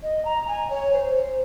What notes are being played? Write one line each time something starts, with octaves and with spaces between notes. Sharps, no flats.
D#5
A#5
G#5
C#5
C5
C5